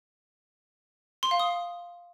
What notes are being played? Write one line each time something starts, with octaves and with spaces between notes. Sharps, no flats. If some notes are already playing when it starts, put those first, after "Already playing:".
C6
F5
D#6